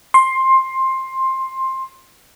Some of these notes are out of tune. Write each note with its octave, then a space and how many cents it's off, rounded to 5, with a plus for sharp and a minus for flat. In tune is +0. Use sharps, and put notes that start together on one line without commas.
C6 +15